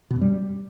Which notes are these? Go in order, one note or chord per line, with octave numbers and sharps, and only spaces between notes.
B2
F#2
G3